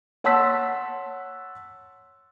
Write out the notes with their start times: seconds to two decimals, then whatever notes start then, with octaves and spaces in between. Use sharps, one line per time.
0.24 C#5 F#5 A5 C6 E6 B6